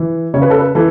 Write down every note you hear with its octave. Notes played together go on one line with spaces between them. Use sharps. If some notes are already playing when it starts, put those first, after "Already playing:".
Already playing: E3
C#3 C#5
B4
A4
B4
E3 A4